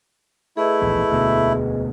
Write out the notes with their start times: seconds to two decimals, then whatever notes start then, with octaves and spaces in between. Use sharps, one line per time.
0.57 A3 E4 G#4 B4 D#5
0.81 D1 A#1 E2
1.10 E1 D2 B2